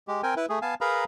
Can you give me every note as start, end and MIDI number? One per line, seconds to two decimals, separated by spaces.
0.08 0.22 56
0.08 0.22 67
0.23 0.34 60
0.23 0.34 70
0.23 0.34 79
0.23 0.34 80
0.37 0.46 64
0.37 0.46 71
0.49 0.59 57
0.49 0.59 68
0.62 0.75 59
0.62 0.75 77
0.62 0.75 80
0.62 0.75 81
0.81 1.04 68
0.81 1.04 70
0.81 1.04 71
0.81 1.04 77
0.81 1.04 82
0.81 1.04 83